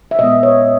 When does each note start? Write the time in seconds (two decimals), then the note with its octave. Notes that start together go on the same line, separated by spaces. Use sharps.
0.11 E5
0.19 A#2 G#3 B3 D#5
0.43 C#5